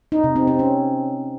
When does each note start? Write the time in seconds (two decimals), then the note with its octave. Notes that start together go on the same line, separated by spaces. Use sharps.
0.12 D#4
0.24 C3
0.36 C4
0.47 C4
0.59 C#4